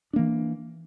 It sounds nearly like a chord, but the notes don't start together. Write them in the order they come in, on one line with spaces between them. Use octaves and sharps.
D4 A#3 E3